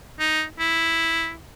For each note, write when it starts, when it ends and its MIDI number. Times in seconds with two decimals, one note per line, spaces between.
0.19 0.43 63
0.59 1.33 64